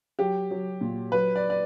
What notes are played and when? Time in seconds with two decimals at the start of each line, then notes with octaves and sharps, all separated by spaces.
0.19 F#3 G4
0.51 F#3
0.81 A#2
1.12 F#3 B4
1.36 D5
1.50 D5